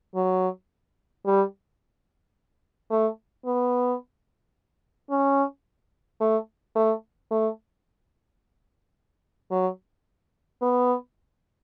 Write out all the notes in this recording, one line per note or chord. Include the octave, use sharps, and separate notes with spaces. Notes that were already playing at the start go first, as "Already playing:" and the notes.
F#3
G3
A3
B3
C#4
A3
A3
A3
F#3
B3